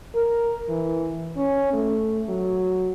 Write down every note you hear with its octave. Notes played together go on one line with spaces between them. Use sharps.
A#4
E3
C#4
A3
F#3